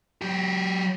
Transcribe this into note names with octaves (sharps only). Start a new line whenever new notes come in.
F#3 G4